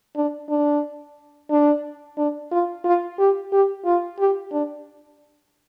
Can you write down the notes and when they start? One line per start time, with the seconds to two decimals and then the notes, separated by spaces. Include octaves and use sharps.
0.16 D4
0.49 D4
1.51 D4
2.18 D4
2.52 F4
2.85 F4
3.19 G4
3.53 G4
3.85 F4
4.19 G4
4.52 D4